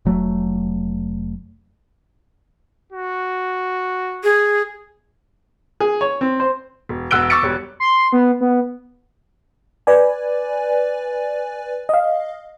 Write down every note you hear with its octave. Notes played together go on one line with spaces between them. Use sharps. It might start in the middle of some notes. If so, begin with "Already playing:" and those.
F1 F#3 A3
F#4
G#4
G#4
C#5
C4
C5
E1
E1 F#5 E6 F#6 D7 G7
C#6 D6 E6 A6 C#7 D7
E1 G3 C#5
C6
B3
B3
B4 D5 G#5
D#5 F5